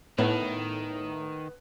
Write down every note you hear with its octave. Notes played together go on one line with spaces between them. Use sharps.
A2 D#3 B3